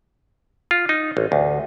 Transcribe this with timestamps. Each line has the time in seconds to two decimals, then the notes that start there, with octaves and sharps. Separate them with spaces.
0.71 F4
0.89 D#4
1.17 A1
1.32 D2